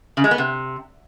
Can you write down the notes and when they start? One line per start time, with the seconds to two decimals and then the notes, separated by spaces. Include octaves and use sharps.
0.17 C#3
0.24 G#3
0.31 B3
0.38 C3